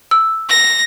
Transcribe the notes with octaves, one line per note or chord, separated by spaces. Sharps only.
E6
A#6